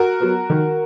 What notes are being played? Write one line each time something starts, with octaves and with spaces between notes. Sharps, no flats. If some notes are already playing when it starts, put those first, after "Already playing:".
Already playing: F#4 A#4
F#3 B3
D#3